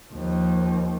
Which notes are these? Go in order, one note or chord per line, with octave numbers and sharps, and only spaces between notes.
D#2 F3